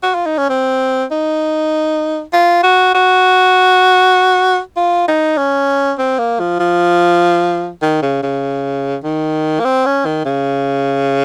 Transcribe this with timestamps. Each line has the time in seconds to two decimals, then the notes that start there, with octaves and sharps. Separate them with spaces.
0.03 F#4
0.15 F4
0.26 D#4
0.38 C#4
0.49 C4
1.11 D#4
2.33 F4
2.63 F#4
2.94 F#4
4.77 F4
5.08 D#4
5.37 C#4
5.98 C4
6.19 A#3
6.40 F3
6.59 F3
7.82 D#3
8.02 C#3
8.23 C#3
9.04 D#3
9.60 A#3
9.65 C4
9.86 C#4
10.05 D#3
10.25 C#3